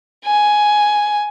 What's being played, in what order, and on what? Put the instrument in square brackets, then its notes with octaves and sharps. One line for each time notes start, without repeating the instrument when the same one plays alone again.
[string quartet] G#5